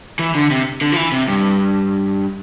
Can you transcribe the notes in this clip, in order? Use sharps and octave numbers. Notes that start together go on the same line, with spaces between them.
E3
D3
C3
D3
F3
E3
C3
G2